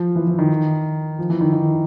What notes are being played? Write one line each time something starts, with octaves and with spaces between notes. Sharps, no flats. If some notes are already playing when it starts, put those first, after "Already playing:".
Already playing: F3
E3
E3
D#3
F3
E3
D#3
D#3